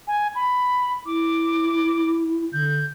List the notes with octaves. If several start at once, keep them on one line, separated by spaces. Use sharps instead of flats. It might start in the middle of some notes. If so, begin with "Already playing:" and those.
G#5
B5
E4 D6
D3 G6